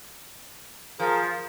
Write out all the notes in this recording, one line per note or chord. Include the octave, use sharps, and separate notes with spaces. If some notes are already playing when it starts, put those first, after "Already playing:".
F3 G#4 A#4